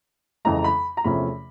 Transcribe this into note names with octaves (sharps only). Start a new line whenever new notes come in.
F2 C#3 E3 G#3 A#5
B5
A#5
E2 C3 F3 A3 C#4 B5